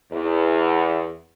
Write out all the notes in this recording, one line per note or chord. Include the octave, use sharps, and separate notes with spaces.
E2